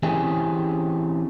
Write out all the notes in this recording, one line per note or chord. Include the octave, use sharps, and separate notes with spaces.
E3 C4 C#4 G4 G#4